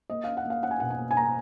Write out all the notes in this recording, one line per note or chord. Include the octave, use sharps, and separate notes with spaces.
A#3 D#5
C#4 F5
F#5
A#3 F5
C#4 F#5
G#5
B2 F#5
G#5
A#3
G#5
A#3 A#5